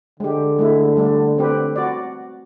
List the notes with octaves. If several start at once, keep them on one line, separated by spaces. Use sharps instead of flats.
D3 G#3 G4
G#3 A3 E4
G3 A3 D4
C4 G4 B4
F#4 D5